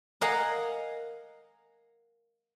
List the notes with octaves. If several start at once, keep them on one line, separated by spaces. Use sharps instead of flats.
A#4 D#5 F5 F#5 G#5 A#5